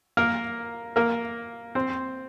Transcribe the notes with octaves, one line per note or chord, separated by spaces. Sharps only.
A#3 A#4
A#3 A#4
C4 C5